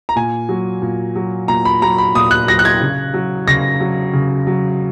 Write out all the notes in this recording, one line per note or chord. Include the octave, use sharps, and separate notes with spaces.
A#5
A#2 G#5
F#3
A#2
F#3
A#2 A#5
B5
F#3 A#5
B5
A#2 D#6
F#6
F#3 A#6
F#6
G#6
C#3
F#3
C#3 A#6
F#3
C#3
F#3